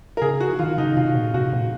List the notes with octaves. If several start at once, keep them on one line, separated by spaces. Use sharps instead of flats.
A#4
C#3 G#4
F#4
D#3 F4
C#3 D#4
C3 F4
A#2
C3 F#4
A#2